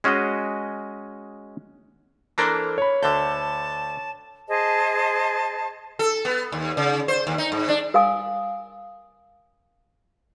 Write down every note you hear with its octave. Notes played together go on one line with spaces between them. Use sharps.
G#3 C#4 F#4 G#4 D#5
E3 A#3 D4 A4 A#4 C5
C#5 B5
D2 D3 A5 G6
G#4 C5 D#5 A5
A4
B3
D#2
C#3
C5
D#2
D#4
G#2
D4
A#4 F5 G#5 D#6